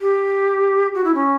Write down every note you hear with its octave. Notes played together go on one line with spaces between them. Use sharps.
G4
F#4
E4
C#4